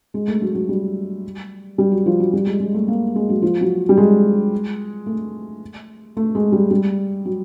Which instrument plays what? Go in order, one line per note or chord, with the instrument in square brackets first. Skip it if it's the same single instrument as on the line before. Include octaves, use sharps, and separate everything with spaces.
[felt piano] G#3
A3
F#3
F#3
G3
G3
F#3
F3
F#3
G3
G#3
G#3
A3
A#3
G#3
F#3
F3
F#3
G3
G#3
A3
A3
G#3
G3
G3
F#3